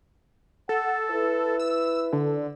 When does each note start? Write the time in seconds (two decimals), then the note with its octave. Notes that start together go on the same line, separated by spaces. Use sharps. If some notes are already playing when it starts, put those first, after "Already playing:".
0.69 A4 F#5
1.10 E4 B4
1.60 E6
2.13 D3